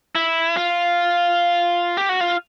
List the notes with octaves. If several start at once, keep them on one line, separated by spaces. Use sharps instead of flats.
E4
F4
G4
F#4
F4